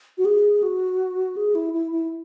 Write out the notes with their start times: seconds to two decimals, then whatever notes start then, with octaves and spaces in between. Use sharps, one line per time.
0.18 F#4
0.25 G#4
0.63 F#4
1.37 G#4
1.55 E4
1.74 E4
1.92 E4